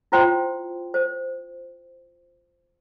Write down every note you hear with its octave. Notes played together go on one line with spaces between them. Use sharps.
E4 F4 C5 G5 C6
C5